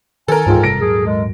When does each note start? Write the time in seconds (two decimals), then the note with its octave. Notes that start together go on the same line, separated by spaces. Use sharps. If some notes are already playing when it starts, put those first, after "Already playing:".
0.28 D#3 A4 A#4 G#5
0.46 F1 C#2 G#2 E3 F4 G5
0.63 F#1 C3 G3 A#6 D7
0.81 D#1 G#2 F#3 G#4
1.06 G#3